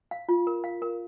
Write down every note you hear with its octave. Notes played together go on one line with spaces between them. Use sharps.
F5
F4
A#4
F5
A#4